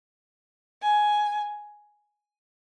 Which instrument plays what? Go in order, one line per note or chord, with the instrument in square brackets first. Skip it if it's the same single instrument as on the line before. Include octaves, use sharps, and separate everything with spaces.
[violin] G#5